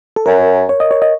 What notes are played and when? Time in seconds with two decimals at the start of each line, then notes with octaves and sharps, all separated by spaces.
0.16 A4
0.26 F#2 A#4
0.69 C#5
0.80 D#5
0.91 C#5
1.02 D#5